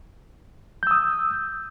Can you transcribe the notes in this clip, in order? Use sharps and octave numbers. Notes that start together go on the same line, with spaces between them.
D#6 E6 G6